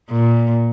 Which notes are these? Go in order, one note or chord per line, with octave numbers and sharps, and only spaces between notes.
A#2